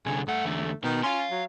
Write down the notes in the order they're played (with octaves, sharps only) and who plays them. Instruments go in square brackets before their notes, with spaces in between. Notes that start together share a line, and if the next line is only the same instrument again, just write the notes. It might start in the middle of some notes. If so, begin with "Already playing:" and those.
[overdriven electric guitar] C2 D3 [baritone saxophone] G#4
[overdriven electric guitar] G2 F#5 [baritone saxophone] A3
[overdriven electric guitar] E2 D3
[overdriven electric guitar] B2 B3 [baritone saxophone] D#3
[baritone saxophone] C#4 [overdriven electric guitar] F5 C6
[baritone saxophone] F#3